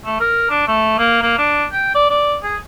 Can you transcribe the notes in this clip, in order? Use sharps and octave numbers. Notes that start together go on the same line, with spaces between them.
A3
A#4
D4
A3
A#3
A#3
D4
G5
D5
D5
G#4